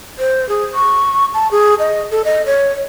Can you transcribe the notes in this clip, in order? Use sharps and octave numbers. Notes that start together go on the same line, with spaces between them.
C5
G#4
C#6
A5
G#4
D#5
A4
D#5
C#5